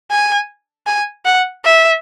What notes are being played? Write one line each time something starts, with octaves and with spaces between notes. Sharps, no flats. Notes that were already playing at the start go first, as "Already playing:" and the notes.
G#5
G#5
F#5
E5